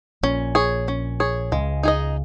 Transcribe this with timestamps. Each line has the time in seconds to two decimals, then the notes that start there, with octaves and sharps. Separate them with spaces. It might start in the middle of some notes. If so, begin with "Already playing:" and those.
0.23 A#1 A#2 C#4
0.55 G#4 C#5
0.88 C#4
1.20 G#4 C#5
1.52 C#2 C#3 G#3
1.83 D#4 G#4 D#5